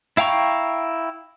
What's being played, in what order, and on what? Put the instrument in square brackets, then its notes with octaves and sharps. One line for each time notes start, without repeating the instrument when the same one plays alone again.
[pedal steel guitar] E4 F5 G5 A#5 C#6